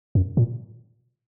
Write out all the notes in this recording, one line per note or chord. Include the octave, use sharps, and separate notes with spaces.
F#2
A#2